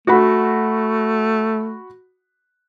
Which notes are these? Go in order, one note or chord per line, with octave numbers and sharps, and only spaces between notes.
A3 F#4 F#5 B5